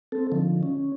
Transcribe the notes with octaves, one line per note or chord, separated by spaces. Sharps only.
C4 A4
D3 D#3 F3
C#4